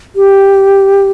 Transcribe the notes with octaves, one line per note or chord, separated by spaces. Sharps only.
G4